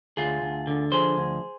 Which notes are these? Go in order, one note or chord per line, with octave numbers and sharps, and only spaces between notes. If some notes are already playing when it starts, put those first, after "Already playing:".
D2 F4 G#4
D2
D3
F3 G#4 C5
D2